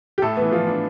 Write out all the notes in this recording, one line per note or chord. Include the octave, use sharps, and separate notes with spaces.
G4
A2 A3 A4
E3 B3 B4
F3 F4
E3
D4